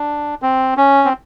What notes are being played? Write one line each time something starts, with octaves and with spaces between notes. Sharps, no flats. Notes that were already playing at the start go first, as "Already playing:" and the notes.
Already playing: D4
C4
C#4
C4